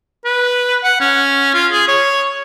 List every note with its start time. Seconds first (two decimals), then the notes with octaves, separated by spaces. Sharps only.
0.25 B4
0.83 F#5
1.00 C#4
1.54 F4
1.72 G#4
1.88 C#5